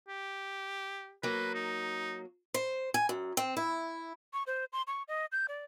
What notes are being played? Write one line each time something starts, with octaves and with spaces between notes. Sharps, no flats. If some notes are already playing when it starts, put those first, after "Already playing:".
G4
F#3 A#3 B4
D#4
C5
G#5
F#2
C4
E4
C#6
C5
C6
C#6
D#5
G6
D5